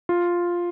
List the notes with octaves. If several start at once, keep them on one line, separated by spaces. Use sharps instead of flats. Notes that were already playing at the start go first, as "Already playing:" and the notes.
F4